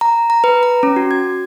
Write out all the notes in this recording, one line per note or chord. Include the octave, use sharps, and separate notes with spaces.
A#5
A#5
B4
A#5
C#4
F#4
G#6